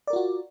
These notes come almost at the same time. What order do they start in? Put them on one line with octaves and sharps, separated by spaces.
D5 A#4 F4 F#4